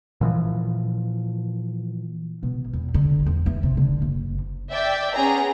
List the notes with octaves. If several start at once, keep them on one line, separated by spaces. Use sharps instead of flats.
A#2 E3 F3
B2
E2
D3
E2
E3
C3
D3
F#1
D5 E5 G5
B3 C#4 G#4 A#5